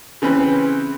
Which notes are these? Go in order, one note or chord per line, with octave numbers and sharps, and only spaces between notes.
C#3 E3 C4 C#4 B4